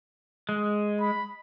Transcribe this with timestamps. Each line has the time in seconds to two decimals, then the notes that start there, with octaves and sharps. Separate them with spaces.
0.49 G#3
1.01 B5